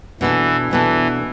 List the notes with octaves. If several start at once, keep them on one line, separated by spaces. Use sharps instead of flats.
B2 E3 B3 D4 A4
B2 E3 B3 D4 A4